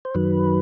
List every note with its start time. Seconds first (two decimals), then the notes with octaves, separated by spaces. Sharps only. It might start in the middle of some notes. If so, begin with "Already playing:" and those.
0.05 C5
0.14 F#2 D#3 F#3 B4